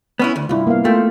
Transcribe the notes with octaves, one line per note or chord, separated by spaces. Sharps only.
B3 C#4 E4
D2
C2 G2 E4 F4
A#3 B3 F5
A3 A#3 F4 G5